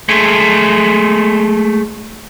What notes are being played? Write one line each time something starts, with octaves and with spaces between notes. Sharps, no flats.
G#3 A3